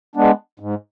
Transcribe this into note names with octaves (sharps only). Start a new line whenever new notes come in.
G#3 B3 D4
G#2